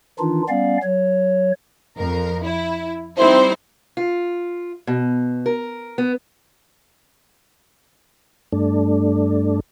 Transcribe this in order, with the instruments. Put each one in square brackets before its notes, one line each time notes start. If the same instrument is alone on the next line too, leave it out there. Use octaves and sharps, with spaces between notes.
[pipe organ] D#3 E3 D4 D#4 F4
G3 B3 C#4 D5 F5
F#3 C#5
[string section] F2 A#4
E4
G3 C4 D#4 E4 C5
[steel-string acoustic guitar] F4
B2
A#4
B3
[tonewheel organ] G2 A3 D4